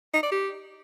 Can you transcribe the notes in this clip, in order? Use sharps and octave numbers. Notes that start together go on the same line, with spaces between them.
D#4
D5
G4